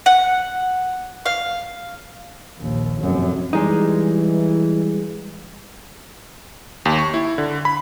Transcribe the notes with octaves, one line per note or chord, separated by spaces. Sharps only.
F#5
F5
A#1 D#2
F1 F#2
E3 G3 G#3 D#4
D#2
C#6
E4
D3
B5